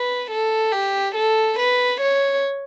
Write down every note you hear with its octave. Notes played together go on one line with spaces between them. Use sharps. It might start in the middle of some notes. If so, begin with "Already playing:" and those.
Already playing: B4
A4
G4
A4
B4
C#5